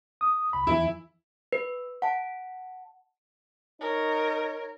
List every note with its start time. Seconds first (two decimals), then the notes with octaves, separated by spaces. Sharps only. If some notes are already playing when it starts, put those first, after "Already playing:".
0.21 D#6
0.53 C2 B5
0.67 E2 E3 E4
1.53 B4
2.02 F#5 A5
3.81 D#4 A#4 C#5